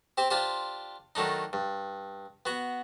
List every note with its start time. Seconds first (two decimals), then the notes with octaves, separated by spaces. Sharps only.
0.18 C4 G4 C5
0.30 D4 F4 G4 C5
1.15 D#3 F#3 A3 D4 D#4
1.53 G2
2.46 B3 F#4